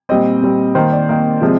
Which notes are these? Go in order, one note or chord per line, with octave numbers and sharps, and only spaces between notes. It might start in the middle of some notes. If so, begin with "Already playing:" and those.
A#2 G3 C4 D#5
A#2 G3 C4
D#3 A#3 C5
D5
D#3 A#3
C3 F3 G#3